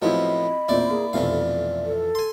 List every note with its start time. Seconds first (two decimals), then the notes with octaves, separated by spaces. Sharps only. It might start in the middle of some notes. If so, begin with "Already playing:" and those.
0.02 A2 F3 F#3 B3 C4 E4 D#5 B5
0.68 E2 A#2 C4 E4 D5
0.90 A#3 G#4
1.13 B1 F2 C3 E3 A3 D5 F5
1.86 A4
2.15 G#5 C6